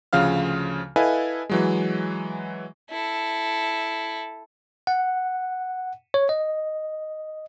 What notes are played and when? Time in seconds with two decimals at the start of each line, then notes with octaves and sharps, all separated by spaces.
0.13 D2 C#3 F3 F5 F6
0.96 E4 A4 B4 D#5 F5 G#5
1.49 E3 F#3 G#3
2.91 E4 A4
4.87 F#5
6.14 C#5
6.29 D#5